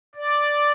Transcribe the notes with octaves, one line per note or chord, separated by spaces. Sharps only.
D5